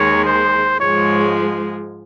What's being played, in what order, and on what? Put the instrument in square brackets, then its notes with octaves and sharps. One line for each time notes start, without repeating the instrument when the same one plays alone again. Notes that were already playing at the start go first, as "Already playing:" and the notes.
Already playing: [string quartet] D#2 D#3 G#3 [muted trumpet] C#5
[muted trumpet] C5
[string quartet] G#2 F3 G#3 [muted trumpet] C#5